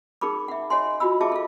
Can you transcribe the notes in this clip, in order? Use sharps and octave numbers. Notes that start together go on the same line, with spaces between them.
D#4 G#4 A#4 B5 D6
E5 F#5
C#5 D#5 F#5 G#5 C6
F4 F#4 D#5 B5 E6
F4 G#4 D#5 E5 A5 D6
A4 F5